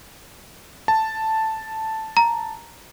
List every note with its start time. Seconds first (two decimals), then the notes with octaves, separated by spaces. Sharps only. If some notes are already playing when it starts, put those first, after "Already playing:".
0.88 A5
2.17 A#5